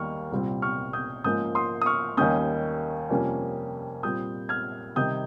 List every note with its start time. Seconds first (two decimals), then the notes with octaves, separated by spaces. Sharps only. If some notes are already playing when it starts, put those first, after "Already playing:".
Already playing: D#2 D#3 G3 A#3 C#6 F6
0.32 C2 A#2 G3 C4
0.62 C#6 F6
0.93 D#6 G6
1.24 G#2 F3 A#3 C#4 D#6 G6
1.55 C6 D#6
1.82 D#6
1.86 C#6 F6
2.17 D#2 D#3 G3 A#3 C#4 D#6 G6
3.10 F2 C3 G3 A#3 C#4
4.03 A#2 G3 C4 D#6 G6
4.49 F6 G#6
4.96 C3 D#3 G3 D#6 G6